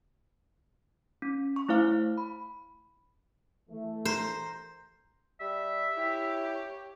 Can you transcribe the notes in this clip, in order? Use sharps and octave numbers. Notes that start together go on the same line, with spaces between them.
C#4
C#6
A3 E4 C5 F5 F6
B5
E3 A3
A#4 C5
G3 E5
E4 G4 C#5